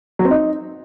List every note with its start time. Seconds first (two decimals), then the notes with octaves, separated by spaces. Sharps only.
0.19 F#3
0.25 C4
0.31 D#4